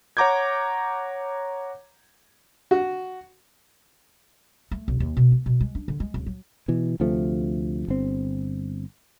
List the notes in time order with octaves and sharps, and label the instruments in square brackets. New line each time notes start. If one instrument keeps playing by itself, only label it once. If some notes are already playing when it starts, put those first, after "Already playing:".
[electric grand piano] C#5 F#5 A#5 D6 G6 G#6
[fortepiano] F#4
[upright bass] A3
B1
D#2
B2
A#3
B2
G#3
D4
D3
G#3
D1
F#3
[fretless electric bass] B2 E3
D2 C3 F3 A3
G1 C4